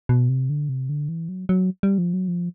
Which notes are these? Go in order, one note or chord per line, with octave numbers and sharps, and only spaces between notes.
B2
C3
D3
C3
D3
E3
F#3
F#3
G3
F3
F#3
F3